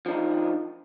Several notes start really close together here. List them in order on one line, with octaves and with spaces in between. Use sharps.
F3 D4 D#4